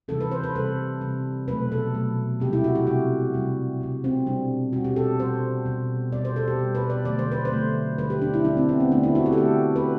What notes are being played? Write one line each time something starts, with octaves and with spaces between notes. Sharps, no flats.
C3 E3 G3 A4
B4
C5
B4
C3 G3 A4
C3 G3
B2 F#3 A3 B4
A4
B2 F#3 A3
C3 G3 G4
E4
F#4
G4
C3 G3 F#4
C3 G3
C3 G3
C4
B2 G3 D4
B2 G3 F#4
G4
A4
B2 G3 C5
B2 G3
B2 G3 D5
C5
A4
G4
B2 G3
B4
D5
D3 F#3 A3 D5
C5
B4
C5
D3 F#3 A3
D3 G3 B4
G4
D4
E4
D3 G3 D4
C4
B3
C4
D3 A3 D4
E4
F#4
G4
A4
D3 A3 G4
B4